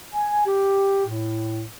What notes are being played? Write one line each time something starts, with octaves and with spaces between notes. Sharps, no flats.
G#5
G4
A2